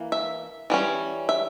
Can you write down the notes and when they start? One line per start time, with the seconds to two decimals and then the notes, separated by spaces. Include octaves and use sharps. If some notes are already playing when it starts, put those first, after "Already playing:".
Already playing: E3 A#3
0.12 E5
0.70 E3 G3 C#4
1.29 E5